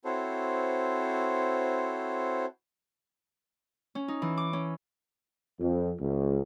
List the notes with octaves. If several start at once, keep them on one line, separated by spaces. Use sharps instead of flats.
C4 E4 F#4 A4 C5 C#5
C#4
D#4
E3
D6
C#4
F2
C#2